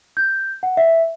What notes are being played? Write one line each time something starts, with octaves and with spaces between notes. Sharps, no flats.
G6
F#5
E5